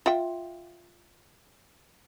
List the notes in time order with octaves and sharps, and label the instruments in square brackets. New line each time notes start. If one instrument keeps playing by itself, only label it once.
[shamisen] F4 E5 G5